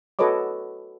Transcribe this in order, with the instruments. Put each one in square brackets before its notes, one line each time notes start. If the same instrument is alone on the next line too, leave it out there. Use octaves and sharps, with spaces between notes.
[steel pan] F#4 A4 B4 C#5 D#5 D6